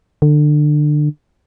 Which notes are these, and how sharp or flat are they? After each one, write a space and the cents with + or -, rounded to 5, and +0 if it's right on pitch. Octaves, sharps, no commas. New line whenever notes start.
D3 +25